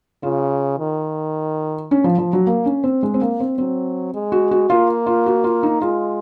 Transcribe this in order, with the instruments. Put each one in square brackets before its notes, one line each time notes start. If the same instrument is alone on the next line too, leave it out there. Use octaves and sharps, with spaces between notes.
[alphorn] C#3 [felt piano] F4
[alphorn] D#3
[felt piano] C#4
F3
F3
F#3
A#3
C#4
C4
G#3
C4
A#3
C4
[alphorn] F#3 [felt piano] C4
[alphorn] G#3
[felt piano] F#4
F#4
[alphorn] A#3 [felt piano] F4
[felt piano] F4
F#4
F4
D#4
[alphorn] G#3 [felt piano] F4